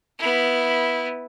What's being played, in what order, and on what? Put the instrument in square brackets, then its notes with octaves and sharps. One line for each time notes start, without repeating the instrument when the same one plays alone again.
[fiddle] B3 E4